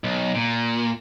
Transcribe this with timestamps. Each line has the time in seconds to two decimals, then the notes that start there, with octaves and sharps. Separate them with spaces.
0.04 B1
0.35 A#2